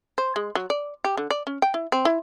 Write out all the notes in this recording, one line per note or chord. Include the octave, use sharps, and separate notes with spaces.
C5
G#3
F#3
D5
G4
D3
D5
C#4
G5
E4
C4
E4